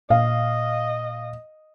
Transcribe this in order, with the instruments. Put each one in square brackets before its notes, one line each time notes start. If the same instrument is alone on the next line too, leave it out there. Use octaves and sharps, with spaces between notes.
[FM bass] A#2 [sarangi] D#5 [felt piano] F5